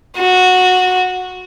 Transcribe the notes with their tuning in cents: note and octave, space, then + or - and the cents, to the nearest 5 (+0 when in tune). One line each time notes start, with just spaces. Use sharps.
F#4 -15